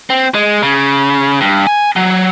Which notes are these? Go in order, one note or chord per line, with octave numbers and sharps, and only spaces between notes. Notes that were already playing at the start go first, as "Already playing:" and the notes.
C4
G#3
C#3
G2
G#5
F#3